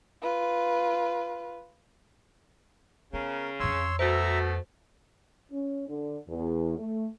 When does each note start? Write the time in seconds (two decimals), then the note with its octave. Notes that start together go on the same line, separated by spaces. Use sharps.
0.22 F4 B4
3.13 C#3 B3 A#4
3.60 F2 E3 C#5 C6 E6
3.99 B2 A3 F#4 C5 E5 A#5
5.52 C#4
5.89 D3
6.29 E2
6.78 A3